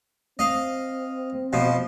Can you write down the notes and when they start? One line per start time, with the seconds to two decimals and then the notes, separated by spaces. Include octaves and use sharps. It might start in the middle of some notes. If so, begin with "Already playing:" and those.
0.39 C4 D#5 F5
1.53 B2 F3